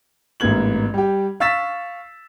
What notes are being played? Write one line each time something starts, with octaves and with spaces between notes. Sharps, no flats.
A1 G#2 A#3 B3 G#6 F#7
G3 G4
F5 C#6 E6 A6 B6 E7